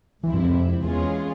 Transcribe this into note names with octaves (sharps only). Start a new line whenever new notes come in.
C#2 C3 E3 F3 C4 E4
G2
F2
F2
E2 E3 G#3 C#4 F4 G#4